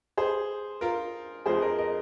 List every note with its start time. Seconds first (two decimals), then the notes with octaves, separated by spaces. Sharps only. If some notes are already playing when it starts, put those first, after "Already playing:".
0.17 G#4 C5
0.81 F4 A#4
1.46 F2 F3 G#3 G#4 C5
1.61 A#4 D#5
1.78 A#4 D#5